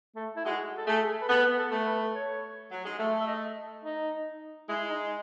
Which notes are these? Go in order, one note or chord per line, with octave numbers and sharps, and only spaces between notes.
A3
E4
G#3 F#4
A4
A3 G#4
B4
B3 A4
A4
A3
B4
C#5
F#3
G#3
A3 E5
E5
D#5
D#4
G#3 E4
D#4